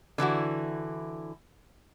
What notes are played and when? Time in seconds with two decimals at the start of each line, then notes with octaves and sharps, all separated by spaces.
0.18 D3 E3 E4 F#4